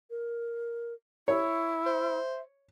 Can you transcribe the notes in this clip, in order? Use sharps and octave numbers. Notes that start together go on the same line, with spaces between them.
A#4
E4 C#5 C#6
C5 E5